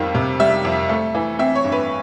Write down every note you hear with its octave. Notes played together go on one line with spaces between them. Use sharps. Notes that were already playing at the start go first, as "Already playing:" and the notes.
Already playing: F2 D#3 G3 F5
C3
G3 E5
F2
A3
E3
C4 E5
C#5
G2
B4